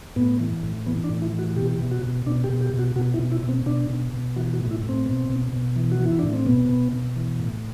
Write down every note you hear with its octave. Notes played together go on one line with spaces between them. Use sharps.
A2 B3
E3
A2
E3 B3
D4
A2
E4
E3
F#4
B2 G4
B2
F#4
B2
B2 D4
G4
B2
G4
B2
F#4
B2 F#4
E4
B2
E4
B2
C4
B2 D4
B2
B2
E3 F#4
F#4
A2
E4
A2
C4
B2
B2
B2
E3
F#4
E3
E4
A2 D4
C4
B2 B3
B2
B2
E3
A2